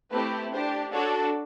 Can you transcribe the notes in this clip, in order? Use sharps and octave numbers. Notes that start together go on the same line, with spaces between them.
A3 C4 E4 G4 B4
D4 G4 C5
D4 F#4 A4 C#5